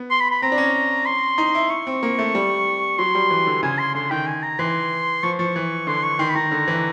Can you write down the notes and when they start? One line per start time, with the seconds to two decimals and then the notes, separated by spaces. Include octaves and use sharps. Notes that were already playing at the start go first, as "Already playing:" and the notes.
Already playing: B3
0.10 C6
0.21 B5
0.31 B5
0.42 C4 A#5
0.52 D4
0.58 C#4
1.06 C6
1.38 D#4
1.55 E4
1.70 C#6
1.87 C4
2.03 A#3
2.19 A3
2.35 G3
2.99 F#3 C6
3.15 G3
3.30 E3
3.47 D3
3.63 C#3 G#5
3.79 C6
3.95 D3 C6
4.10 D#3 G5
4.27 G#5
4.43 A#5
4.59 E3 C6
5.23 F3 C#6
5.39 F3 C#6
5.56 E3
5.87 D3 C6
6.03 C#6
6.19 D#3 C6
6.30 B5
6.35 D#3 A#5
6.52 D3
6.68 E3